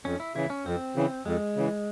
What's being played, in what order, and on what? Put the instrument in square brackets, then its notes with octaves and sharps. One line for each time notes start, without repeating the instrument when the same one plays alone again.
[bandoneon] F2 [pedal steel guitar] C#4
[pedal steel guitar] E4
[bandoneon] C#3 E3 [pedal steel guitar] E4
[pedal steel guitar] C#4
[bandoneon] F2 [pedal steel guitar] C4
[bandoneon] C#3 E3
[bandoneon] F2 [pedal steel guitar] G#3
[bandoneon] C#3 E3